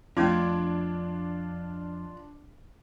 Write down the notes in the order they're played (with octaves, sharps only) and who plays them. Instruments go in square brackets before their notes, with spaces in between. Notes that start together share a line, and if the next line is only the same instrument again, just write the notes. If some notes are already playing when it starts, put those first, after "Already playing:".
[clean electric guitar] F2 [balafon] A3 C4 [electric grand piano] D4 D6 G#6 [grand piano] F4